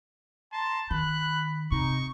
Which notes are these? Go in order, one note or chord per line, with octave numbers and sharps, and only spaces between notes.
A5 A#5 C6
D#3 B5 F#6
C3 D#4 C#6